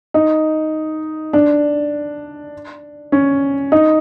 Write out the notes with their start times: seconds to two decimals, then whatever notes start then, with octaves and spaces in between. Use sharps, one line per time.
0.14 D#4
1.33 D4
3.12 C#4
3.72 D#4